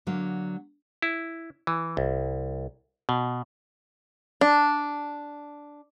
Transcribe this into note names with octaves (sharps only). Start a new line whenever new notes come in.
D3 F#3 A#3
E4
E3
C2
B2
D4